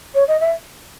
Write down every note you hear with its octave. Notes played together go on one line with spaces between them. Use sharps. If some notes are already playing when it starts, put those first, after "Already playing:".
C#5
D#5
E5